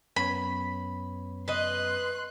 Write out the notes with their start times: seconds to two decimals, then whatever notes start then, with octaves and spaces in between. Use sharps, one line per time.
0.16 F#2 B3 C#5 B5
1.48 B4 D#5 C6 F#6